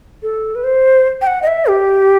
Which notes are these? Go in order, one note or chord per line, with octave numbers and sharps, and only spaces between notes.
A4
B4
C5
G5
F#5
D#5
E5
G4